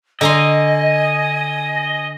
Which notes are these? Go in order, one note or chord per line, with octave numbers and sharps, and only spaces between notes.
D3 D#5 G#5 A#5 C6